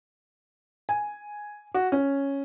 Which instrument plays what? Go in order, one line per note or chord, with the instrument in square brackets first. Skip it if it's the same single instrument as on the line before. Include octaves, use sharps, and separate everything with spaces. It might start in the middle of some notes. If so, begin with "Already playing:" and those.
[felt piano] G#5
F#4
C#4